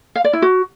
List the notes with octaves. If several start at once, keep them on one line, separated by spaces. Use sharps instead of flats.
F5
D5
E4
F#4